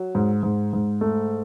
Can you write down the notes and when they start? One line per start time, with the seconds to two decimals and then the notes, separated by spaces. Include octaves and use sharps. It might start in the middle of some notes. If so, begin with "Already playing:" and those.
Already playing: F#3
0.15 G#2
0.43 G#2
0.73 G#2
1.01 A3